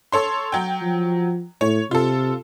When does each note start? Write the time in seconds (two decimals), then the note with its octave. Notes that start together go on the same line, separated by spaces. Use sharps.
0.12 A4 C#5 C6
0.52 F#3 G5
0.81 F3
1.61 A2 C#5
1.91 C3 F4 A4